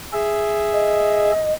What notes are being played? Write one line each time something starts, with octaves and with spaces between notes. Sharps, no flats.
G#4 E5
D#5